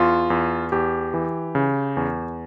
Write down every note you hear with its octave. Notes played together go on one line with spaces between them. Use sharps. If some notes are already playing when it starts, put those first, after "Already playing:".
Already playing: E2 F4
E2
E2 G4
E3
C#3
E2